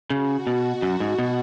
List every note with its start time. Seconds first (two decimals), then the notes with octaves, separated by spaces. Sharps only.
0.10 C#3 F#4
0.47 B2 F#4
0.82 F#2
1.00 G#2
1.19 B2